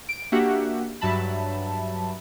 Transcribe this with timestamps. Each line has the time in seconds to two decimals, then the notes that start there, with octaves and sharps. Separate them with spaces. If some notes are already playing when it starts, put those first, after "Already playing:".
0.09 D7
0.32 A#3 D4 F#4 G4 E5 F#5
1.01 G2 F#3 E5 A5 B5